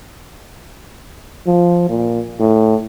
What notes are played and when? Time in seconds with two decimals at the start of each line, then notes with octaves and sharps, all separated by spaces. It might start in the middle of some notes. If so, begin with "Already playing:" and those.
1.47 F3
1.89 A#2
2.40 A2